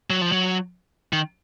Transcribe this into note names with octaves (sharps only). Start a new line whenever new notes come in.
F#3
F3
F#3
D#3